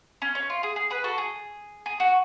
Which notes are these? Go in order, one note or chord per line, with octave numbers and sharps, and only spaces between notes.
C#4
C#4
F4
G#4
G#4
G#4 B4
F#4 A4
G#4
G#4
F#4